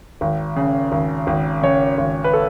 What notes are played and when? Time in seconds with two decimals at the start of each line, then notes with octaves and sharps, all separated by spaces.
0.21 G#1
0.56 C#3
0.92 G#1
1.27 G#1
1.63 C#3 C#5
1.98 G#1
2.24 B4
2.33 A4